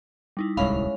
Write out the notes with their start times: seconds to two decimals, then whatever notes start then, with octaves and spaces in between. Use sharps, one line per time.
0.37 G3 D#4 E4
0.57 D1 C2 G#3 C#4 E4 F5 B5 F7